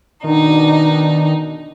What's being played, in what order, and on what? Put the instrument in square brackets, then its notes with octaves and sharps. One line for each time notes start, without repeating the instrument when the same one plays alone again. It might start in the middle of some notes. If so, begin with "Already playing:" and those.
[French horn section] B2 D4 [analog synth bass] D#3 [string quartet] D#4